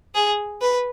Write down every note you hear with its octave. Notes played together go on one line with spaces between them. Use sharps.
G#4
B4